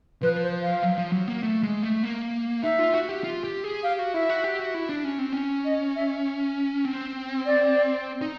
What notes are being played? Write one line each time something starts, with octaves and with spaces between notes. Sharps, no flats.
F3 B4
C5
F5
F#3
F3
F#3
A#3
A3
G#3
A3
A#3
D#4 E5
F4
F#4
G4
F4
G4
G#4
G4 F5
F#4
E4 E5
F#4
G4
F#4
E4
D4
C#4
C4
C#4
D#5
E5
C4
D5
D#4